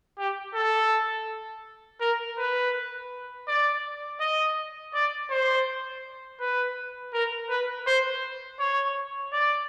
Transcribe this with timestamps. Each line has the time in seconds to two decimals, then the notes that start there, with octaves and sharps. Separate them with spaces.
0.18 G4
0.55 A4
2.01 A#4
2.38 B4
3.48 D5
4.20 D#5
4.94 D5
5.31 C5
6.40 B4
7.13 A#4
7.49 B4
7.87 C5
8.59 C#5
9.32 D5